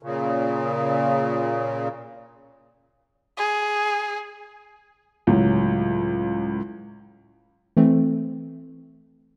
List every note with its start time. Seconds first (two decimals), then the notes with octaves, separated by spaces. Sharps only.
0.03 A#2 C#3
3.37 G#4
5.27 C#2 A2 F#3
7.77 E3 A3 C4